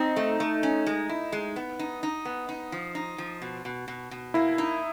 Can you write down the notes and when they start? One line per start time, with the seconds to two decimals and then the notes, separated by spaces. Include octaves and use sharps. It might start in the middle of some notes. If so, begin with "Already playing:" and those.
Already playing: C4 D#4
0.16 A3
0.40 A3
0.63 C#4
0.86 G#3
1.09 E4
1.32 G#3
1.56 B3
1.79 D#4
2.03 D#4
2.25 B3
2.49 D#4
2.72 F3
2.95 D#4
3.18 F3
3.42 B2
3.65 B2
3.88 B2
4.11 B2
4.34 A#3 E4
4.58 D#4